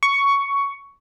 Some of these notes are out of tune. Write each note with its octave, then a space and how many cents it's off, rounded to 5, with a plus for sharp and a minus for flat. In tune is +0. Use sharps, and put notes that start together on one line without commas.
C#6 +10